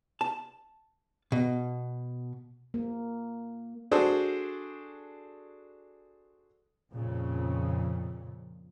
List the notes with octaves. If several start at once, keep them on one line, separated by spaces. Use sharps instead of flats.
A5
B2
A#3
D4 F#4 G#4 A4 C5 D5
F2 A#2 C#3